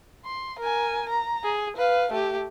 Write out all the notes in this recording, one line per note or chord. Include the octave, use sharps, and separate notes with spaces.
C6
A#4 G#5
A#5
G#4
B4 F5
A3 G4